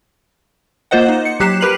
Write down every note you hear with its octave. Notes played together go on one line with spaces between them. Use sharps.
A#3 F4 C5 D#5 F#5
D#4
C#7
F#3 G4 F#6 C7 E7
G4 A#4 B4 C7 F7 F#7